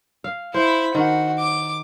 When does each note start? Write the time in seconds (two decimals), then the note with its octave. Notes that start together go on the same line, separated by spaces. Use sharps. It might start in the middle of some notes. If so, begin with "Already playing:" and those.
0.24 F5
0.54 E4 C5 B5
0.95 D#3 F#4
1.39 D6